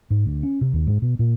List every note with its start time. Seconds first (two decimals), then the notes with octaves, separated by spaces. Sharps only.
0.10 G#2
0.26 D2
0.43 C#4
0.61 C3
0.73 D#2
0.87 G#2
1.02 B2
1.19 A#2